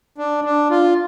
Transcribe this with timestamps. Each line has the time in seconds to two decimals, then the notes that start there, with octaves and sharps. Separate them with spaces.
0.18 D4
0.44 D4
0.70 F4